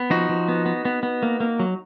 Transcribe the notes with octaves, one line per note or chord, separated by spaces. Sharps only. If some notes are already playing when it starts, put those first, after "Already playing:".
Already playing: B3
F3 D#4 F#4
F3
B3
B3
B3
B3
A#3
A#3
F#3